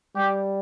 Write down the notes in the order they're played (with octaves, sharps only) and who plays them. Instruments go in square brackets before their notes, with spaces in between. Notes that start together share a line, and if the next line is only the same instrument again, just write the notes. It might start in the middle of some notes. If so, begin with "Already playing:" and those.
[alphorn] G3 [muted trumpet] G4